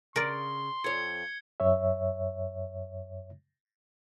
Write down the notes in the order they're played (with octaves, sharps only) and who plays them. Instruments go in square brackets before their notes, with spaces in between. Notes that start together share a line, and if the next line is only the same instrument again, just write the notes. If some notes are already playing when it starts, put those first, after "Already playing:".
[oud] C#3 [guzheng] A#4 D5 [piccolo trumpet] C6
[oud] F2 C#5 [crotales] G#6 C#7 G7
[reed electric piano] F#2 C#5 E5